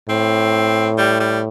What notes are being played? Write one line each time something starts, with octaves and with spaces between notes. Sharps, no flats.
A2 C4
G3
G3